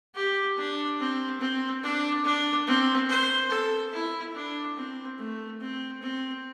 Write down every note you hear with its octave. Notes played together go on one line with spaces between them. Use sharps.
G4
D4
C4
C4
D4
D4
C4
C5
A4
E4
D4
C4
A3
C4
C4